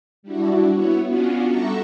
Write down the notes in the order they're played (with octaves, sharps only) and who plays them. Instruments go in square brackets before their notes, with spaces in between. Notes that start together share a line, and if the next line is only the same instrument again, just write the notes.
[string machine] G3 D4 E4 F#4
B3 E4 F#4 C#5
B3 C#4 D4 F4 F#4
G3 A4 E5 F#5 A#5 C#6